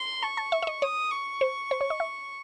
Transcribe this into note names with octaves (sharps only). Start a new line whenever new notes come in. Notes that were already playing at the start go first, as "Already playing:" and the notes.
Already playing: C6
A5 C#6
A5
E5
E5
D#5
C#5 D#6
C#6
C5
C5
C#5
D#5
E5